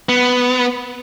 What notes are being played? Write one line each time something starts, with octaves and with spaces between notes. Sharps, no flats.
B3